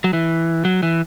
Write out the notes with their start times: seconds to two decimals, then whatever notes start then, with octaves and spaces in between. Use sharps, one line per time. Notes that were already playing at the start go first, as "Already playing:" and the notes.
0.04 F#3
0.13 E3
0.65 F#3
0.83 E3